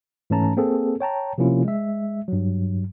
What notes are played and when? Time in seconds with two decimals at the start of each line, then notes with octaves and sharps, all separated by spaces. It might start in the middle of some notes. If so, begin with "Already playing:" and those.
0.30 G#2 E3 A3 C#4 A5 A#5
0.57 A#3 C4 G#4 A4
1.00 C#5 G5 A5 A#5
1.38 C3 F3 A#3 C#4 E4 F4
1.65 G#3 E5
2.28 G2 F#3